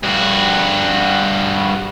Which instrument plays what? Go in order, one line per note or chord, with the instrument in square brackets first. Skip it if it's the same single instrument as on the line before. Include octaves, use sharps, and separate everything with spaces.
[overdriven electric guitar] G2 F#4